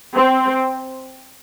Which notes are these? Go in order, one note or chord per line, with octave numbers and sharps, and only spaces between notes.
C4